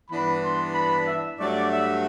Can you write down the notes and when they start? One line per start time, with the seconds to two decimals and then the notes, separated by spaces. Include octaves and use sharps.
0.09 G2 E3 B3 D4 B5
0.43 C6
0.74 B5
1.07 E5
1.38 G2 F#3 A3 D5
1.72 E5